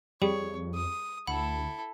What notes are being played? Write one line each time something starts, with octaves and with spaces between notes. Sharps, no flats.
F2 G3 G#4 C#5
D#6
D2 E4 A4 F#5 B5